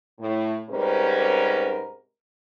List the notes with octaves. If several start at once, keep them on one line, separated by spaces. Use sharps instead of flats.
A2
G#2 C3 G3 C#4 A#4 B4